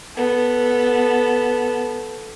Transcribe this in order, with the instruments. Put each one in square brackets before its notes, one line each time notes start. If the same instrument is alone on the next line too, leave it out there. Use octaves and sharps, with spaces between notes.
[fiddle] B3 A4